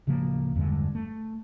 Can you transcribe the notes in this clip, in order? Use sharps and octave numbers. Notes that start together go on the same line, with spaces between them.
D1 C#3 F3 A#3
E2 G2 D3 G#3
A3